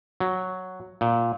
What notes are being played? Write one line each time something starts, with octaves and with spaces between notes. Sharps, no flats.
F#3
A#2